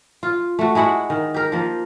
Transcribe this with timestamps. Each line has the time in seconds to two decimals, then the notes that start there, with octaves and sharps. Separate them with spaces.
0.23 F4
0.59 A3 F#4
0.75 G#3 E4 F#4 F#5
1.10 D#3
1.34 G4 A#4
1.52 F3 A#3